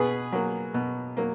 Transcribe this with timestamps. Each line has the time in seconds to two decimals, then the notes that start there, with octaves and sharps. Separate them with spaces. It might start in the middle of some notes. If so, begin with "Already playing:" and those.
Already playing: B2 G#4 B4
0.32 F#3 A#3
0.74 B2
1.17 F#3 A#3